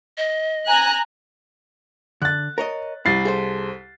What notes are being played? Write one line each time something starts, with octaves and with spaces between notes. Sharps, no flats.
D#5
G#5 A#5 F#6
D3 F#6 A6
A#4 C#5 D#5
C2 E4 A6 C7
G#4 A4 C5